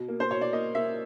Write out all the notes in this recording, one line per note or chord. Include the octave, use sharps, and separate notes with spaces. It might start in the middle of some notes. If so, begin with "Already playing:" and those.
Already playing: B2
A#3
C5
B2 C#5
D5
A#3 D#5
A#3 E5